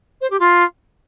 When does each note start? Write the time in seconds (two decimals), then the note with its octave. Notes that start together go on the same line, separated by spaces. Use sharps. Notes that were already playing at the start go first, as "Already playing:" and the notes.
0.21 C5
0.30 G4
0.40 F4